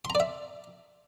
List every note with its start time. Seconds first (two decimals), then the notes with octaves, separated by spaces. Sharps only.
0.05 C6
0.10 A#5
0.15 D5
0.20 E5